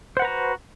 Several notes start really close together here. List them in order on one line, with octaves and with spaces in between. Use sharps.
C5 F#5 B4 A#5 F#4